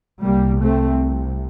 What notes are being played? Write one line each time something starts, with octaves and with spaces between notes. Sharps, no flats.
C2 C3 G3 A#3
A3 C4